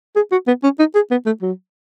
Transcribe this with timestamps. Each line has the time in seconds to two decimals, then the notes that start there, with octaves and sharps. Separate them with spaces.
0.16 G#4
0.32 F#4
0.48 B3
0.63 C#4
0.79 D#4
0.95 G#4
1.11 B3
1.26 A3
1.42 F#3